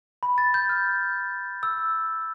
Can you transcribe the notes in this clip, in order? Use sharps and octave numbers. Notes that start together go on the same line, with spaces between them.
B5
A6
G6
F6
E6